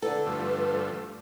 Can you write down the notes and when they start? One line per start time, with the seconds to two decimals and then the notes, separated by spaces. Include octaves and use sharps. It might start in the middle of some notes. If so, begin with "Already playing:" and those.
0.02 D3 A4 B4
0.26 G2 F3 A3